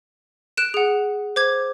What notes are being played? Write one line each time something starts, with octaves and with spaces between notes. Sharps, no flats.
F#6 D7 E7
G#4 F#5
C5 D6 G#6